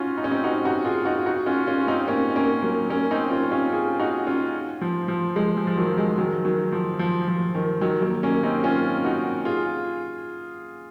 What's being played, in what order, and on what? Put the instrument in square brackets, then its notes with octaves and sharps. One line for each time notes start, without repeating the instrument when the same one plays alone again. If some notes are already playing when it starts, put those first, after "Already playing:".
Already playing: [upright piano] C#4 D#4 F4 F#4
D#4
C#4
C4 D#4
D#4 F#4
D#4 F#4
F4 G#4
D#4 F#4
D#4 F#4
C#4 F4
C#4 F4
F4
C4 D#4
A#3 C#4
A#3 C#4
F#3 A#3
A#3 C#4
C4 D#4
C#4 F4
C#4 F4
F4 G#4
D#4 F#4
C#4 F4
F3
F3
F3 G#3
F3
F3
D#3 F#3
F3 G#3
D#3 F#3
D#3 F#3
F3
F3
F3
D#3
D#3 F#3
F#3 A#3
A#3 C#4
C4 D#4
C#4 F4
D#4 F#4
F4 G#4